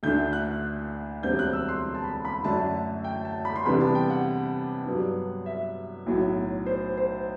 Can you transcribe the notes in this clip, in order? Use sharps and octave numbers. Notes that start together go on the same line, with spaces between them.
D2 D3 A3 D4 G6
F#6
E1 D2 D3 G3 C4 G6
F#6
E6
C6
A5
B5
B5
F#2 D3 A3 D4 A5
G5
A5
B5
C6
E2 C3 G3 B3 D4 B5
A5
G5
F#5
G2 F#3 B3 D4
E5
B1 A2 F#3
C5
C5